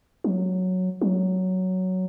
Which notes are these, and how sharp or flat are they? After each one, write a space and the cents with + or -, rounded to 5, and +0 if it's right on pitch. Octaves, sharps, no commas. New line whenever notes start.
F#3 -5
F#3 +5